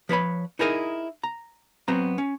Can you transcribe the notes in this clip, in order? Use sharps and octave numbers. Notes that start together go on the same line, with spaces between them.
F3 B4 C#5 B5
D#4 E4 G#4 A#4 C5 D#5
A#5
F#3 B3 C4 A#5
C#4